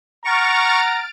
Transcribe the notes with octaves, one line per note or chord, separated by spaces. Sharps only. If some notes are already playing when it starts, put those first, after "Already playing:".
F#5 A#5 C#6 F6 A6 D7